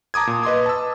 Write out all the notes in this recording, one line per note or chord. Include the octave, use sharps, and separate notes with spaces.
A5 A#5 D6 D#6 G#6
A#2
B4 D#5 C6 D#6
A5 E6